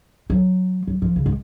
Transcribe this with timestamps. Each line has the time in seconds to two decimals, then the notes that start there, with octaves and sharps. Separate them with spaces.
0.30 F#3
0.87 F#3
1.02 F3
1.16 C#3
1.26 G#3